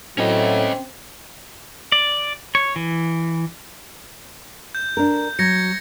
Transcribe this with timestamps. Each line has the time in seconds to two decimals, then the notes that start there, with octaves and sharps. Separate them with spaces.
0.18 A2 F#3 C4 C#4 D#5
1.92 D5
2.55 C#5
2.76 E3
4.75 G6
4.97 D4 A#4
5.39 F#3 G#6 A#6 C#7